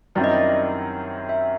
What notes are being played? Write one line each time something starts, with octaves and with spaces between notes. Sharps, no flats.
F#2 D#3 G3 C4 E4 D5
D#5
D5
E5